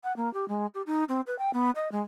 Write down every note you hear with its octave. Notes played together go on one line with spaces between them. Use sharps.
F#5
A#3
G4
G#3
G4
D#4
C4
B4
G5
B3
D#5
G#3